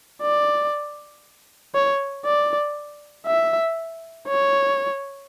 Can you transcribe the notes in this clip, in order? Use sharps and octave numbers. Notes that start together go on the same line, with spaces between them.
D5
C#5
D5
E5
C#5